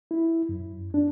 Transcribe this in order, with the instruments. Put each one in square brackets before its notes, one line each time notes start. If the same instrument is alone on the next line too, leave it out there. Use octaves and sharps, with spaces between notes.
[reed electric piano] E4
F#2
D4